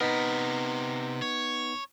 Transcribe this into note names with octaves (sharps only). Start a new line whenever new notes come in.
C3 B3 D#4 A#4 B6
C#5